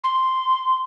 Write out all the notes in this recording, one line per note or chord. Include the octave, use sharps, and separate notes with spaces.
C6